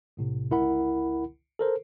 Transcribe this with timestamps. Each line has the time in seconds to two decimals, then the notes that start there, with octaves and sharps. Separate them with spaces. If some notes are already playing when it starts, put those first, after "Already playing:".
0.17 B1 A2 C3
0.50 G1 C#2 E4 A#4 F#5 B5
1.59 A4 A#4 C5